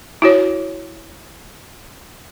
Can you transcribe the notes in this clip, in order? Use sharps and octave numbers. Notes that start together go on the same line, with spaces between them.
E4 F#4 C#5